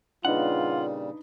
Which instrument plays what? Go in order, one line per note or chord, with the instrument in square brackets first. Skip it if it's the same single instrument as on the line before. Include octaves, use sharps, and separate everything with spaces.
[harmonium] A#2 C#3 G3 [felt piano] D4 D#4 B4 [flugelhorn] F4 [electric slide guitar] F#5